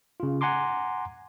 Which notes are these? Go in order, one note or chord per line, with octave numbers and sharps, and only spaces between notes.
C#3 F4
F#5 G#5 A#5 C6 D6